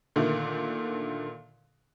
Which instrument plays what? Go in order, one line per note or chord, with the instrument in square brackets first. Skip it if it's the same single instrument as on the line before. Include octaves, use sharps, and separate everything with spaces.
[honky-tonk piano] A#2 D3 D#3 A3